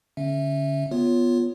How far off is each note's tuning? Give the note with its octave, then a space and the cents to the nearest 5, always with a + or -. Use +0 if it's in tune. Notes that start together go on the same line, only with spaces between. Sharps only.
D3 -30 C#4 +0 E5 +0
B3 +0 F4 +0 C#5 +0